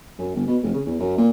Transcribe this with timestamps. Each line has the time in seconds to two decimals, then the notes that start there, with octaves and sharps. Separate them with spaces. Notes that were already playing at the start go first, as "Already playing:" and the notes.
0.19 F#2
0.35 G1
0.47 B2
0.63 F1
0.74 C#3
0.86 E2
1.00 F#2
1.17 A#2